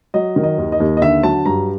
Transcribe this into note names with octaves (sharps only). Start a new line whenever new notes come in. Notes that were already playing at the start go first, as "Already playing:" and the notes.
F#3 D#5
D#3
D#5
D#2
D#5
D#2
D#5
D3 E5
F#3 A5
G2 A#5